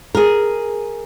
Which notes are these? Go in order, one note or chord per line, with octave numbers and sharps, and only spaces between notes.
G#4 A#4